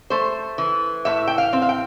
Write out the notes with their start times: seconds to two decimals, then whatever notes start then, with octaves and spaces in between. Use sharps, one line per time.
0.10 A3 C5
0.58 E3
1.05 A2 E5
1.27 G5
1.38 F5
1.53 C4
1.62 F5
1.69 G5